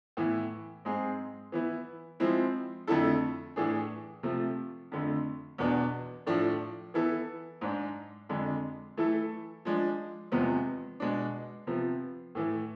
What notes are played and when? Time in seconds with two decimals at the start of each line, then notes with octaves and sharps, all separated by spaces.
0.17 A2 E3 B3 E4
0.85 G#2 G#3 C4 G#4
1.52 E3 B3 E4
2.20 F3 G#3 C4 E4
2.87 F2 D3 A3 E4 A4
3.56 A2 E3 A3 D4 G#4
4.23 C3 F3 A3
4.92 F2 D3 A3
5.58 E2 B2 B3 D4
6.26 A2 F3 A3 D4
6.94 E3 B3 E4 A4
7.61 G#2 G#3 D4
8.29 F2 D3 G#3 D4
8.97 E3 A3 E4 A4
9.65 F3 G#3 D4
10.32 E2 C3 F3 G#3 B3
11.00 B2 G#3 D4
11.67 C3 F3 B3
12.35 A2 E3 A3